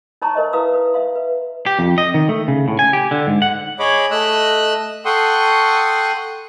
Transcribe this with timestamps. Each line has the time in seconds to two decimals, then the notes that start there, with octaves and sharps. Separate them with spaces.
0.22 D#4 C#5 A5 A#5 C6 C#6
0.35 A#4 C5 D#5 E5
0.53 E4 B4 F5 A#5 D#6 E6
0.73 B4
0.94 E5 F5 C6
1.16 B4
1.66 G4
1.79 F2
1.98 D#5
2.14 D#3
2.29 A3
2.48 C#3
2.68 A2
2.79 G#5
2.93 G4
3.11 D3
3.27 G#2
3.42 F#5
3.79 G#4 C#5 D#5 B5 D6
4.11 A3 D#5 E6 F#6
5.05 A4 F#5 G5 C6 C#6 D#6